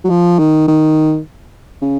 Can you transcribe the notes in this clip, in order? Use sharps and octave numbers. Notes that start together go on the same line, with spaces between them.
F#3
F3
D#3
D#3
C#3